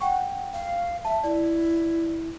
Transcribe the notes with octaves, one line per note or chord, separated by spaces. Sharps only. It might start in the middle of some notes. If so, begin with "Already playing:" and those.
F#5 G5 C#6
F5
E5 A5
E4 D5